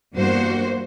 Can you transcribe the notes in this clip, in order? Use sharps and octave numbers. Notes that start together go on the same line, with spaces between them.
E2 G2 G3 A#3 F#4 C5